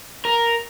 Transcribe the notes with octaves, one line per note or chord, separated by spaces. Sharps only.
A#4